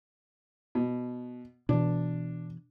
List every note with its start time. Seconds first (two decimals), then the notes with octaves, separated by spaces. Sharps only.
0.75 B2
1.69 B2 E3 D4